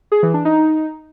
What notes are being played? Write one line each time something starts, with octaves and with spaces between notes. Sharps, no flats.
G#4
E3
D4
D#4